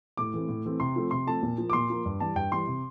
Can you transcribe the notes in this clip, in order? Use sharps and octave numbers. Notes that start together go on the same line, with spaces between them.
A2 D6
E3 A3 C4
A2
E3 A3 C4
C3 C6
F3 A3 C4
C3 C6
F3 A3 C4 A5
A#2
F3 A#3
D6
A#2 C6
F3 A#3
G2
E3 G3 A5
G2 G5
E3 G3 C6
C3